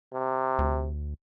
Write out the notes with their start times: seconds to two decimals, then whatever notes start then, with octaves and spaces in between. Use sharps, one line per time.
0.14 C3
0.59 D2